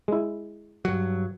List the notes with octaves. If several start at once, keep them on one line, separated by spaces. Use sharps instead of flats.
G#3 E4
G2 F#3